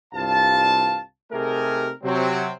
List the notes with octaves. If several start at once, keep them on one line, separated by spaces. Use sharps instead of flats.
C2 G2 F4 F5 A5
C3 A3 D#4 G4 G#4 A#4
C3 F#3 C4